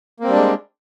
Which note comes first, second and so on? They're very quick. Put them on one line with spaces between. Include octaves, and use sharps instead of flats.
A#3 C4 G3 D4 G#3